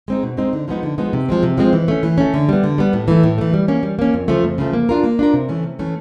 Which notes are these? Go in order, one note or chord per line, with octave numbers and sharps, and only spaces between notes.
G#3 C4 D#4
B2
G#3 C4 D#4
D3
F3 G#3 B3 D#4
D3
F3 G#3 B3 D#4
C3
F3 G#3 C4
C3
F3 G#3 C4
E3
A3 C#4
E3
A3 C#4
D3
G3 B3
D3
G3 B3
A2
E3 A3
A2
E3 A3
G3
A#3 C#4
G3
A#3 C#4
F2
C#3 F3 A3
F2
C#3 F3 A3
A#3
D4 F4 A#4
A#3
D4 F4 A#4
C3
E3 A3 C#4
C3
E3 A3 C#4